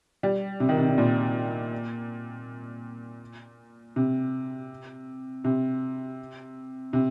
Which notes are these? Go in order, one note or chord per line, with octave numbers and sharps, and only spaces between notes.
G3
C3
D#3
C3
C3
A#2
C3
C3
C3